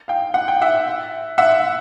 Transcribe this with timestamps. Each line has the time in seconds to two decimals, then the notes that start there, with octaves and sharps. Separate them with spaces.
0.08 F5 G5
0.34 F#5
0.48 G5
0.62 E5 F#5
1.38 E5 F#5